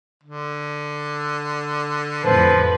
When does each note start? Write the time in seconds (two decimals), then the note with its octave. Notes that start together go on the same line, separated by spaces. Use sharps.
0.23 D3
2.24 A1 F2 F3 B4